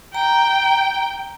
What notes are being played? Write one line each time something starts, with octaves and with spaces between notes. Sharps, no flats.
G5 A#5